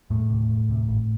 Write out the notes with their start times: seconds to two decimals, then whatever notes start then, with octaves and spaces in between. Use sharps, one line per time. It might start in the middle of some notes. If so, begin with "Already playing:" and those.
0.10 E1 A2 A3
0.29 D2 C3
0.48 E1
0.68 D2 C3
0.87 G#1